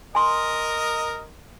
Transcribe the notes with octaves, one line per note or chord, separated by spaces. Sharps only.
A#4 D#5 G#5 C6